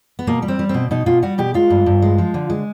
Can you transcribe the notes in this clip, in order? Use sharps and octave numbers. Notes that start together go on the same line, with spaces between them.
B3
B2 A#3
G3
C4
G3
B2 C4
B2 D#4
B2 F4
G3 F#4
B2 G4
G#3 F4
G2
G2
G#3
F3
D3
G#3